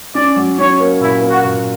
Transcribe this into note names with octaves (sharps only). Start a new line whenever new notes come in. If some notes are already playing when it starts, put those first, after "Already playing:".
C#4 D5
F#3
C#4 C#5
A#3
A#2 E4
A#3
F#4
A#2